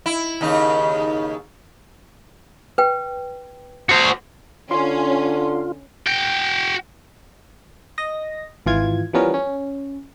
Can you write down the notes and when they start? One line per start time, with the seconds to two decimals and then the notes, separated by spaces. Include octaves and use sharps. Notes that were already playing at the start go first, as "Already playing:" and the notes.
0.06 E4
0.41 D#2 C#3 D#4
2.78 B4 G5
3.89 F#4 C5
4.71 D3 C#4 F4 C6
6.07 F#4 G5
7.98 D#5 A#6
8.66 G#1 E3 F4 G#6
9.13 E3 F3 G3 B3 C#4 A#4
9.34 C#4